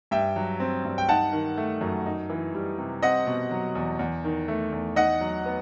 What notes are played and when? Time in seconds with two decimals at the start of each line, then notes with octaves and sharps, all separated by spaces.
0.11 G2 E5 G5
0.36 F#3
0.60 C4
0.85 G2
0.98 G5
1.09 D#4 F#5 A5
1.33 D#3
1.57 A3
1.81 F#2
2.06 D#4
2.30 E3
2.54 G3
2.78 C3
3.02 C4 D#5 F#5
3.27 B2
3.51 F#3
3.75 E2
3.99 E2
4.24 D#3
4.48 A3
4.72 E2
4.96 D#4 D#5 F#5
5.21 F#3
5.46 B3